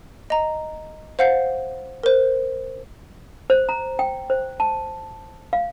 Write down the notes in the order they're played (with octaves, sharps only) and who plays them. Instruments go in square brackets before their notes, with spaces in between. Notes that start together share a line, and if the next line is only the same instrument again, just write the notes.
[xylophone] D#5 A#5
C5 F5 F#5 G6 C7
A#4 C5
[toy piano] C5
A#5
G5
C5
A5
F5